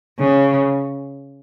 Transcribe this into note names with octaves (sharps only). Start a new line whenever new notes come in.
C#3